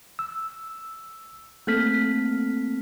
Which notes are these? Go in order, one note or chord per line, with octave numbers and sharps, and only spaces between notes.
E6
A3 A#3 C4 A4 F6 B6